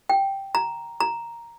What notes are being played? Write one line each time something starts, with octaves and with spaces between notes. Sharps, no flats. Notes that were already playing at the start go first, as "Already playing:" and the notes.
G5
A#5
A#5